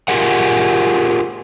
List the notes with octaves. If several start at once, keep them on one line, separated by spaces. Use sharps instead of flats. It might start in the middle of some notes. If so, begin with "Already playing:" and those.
F4 G4 G#4 A#4 F#5